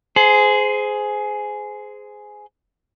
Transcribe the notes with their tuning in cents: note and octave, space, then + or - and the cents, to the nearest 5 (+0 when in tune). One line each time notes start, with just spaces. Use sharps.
G#4 +15 C5 -20